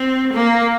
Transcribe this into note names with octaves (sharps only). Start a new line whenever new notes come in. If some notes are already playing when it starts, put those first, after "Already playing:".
Already playing: C4
A#3